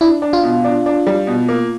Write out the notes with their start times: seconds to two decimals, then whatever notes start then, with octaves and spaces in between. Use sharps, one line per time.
0.01 D4 E4
0.22 D4
0.33 F4
0.43 B2
0.64 D4
0.86 D4
1.07 G3
1.27 B2
1.49 A#3